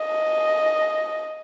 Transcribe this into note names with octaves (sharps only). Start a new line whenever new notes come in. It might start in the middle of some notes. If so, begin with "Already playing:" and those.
Already playing: D#5